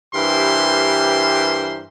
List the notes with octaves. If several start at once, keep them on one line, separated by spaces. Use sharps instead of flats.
G2 E3 G4 A#4 C5 C6